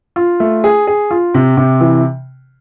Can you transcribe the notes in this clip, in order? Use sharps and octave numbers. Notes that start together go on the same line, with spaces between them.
F4
A3
G#4
G#4
F4
C3
C3
E3